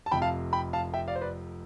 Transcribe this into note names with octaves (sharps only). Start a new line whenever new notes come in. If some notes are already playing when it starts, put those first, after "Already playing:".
A5
F1 F2 C3 G5 B5
F5 A5
G5 B5
F5 A5
E5 G5
D5 F5
C5
B4 D5